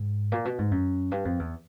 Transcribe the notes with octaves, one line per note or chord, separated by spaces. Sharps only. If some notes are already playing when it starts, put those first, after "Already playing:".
Already playing: G#2
A#2
B2
G#2
F#2
G2
F2
E2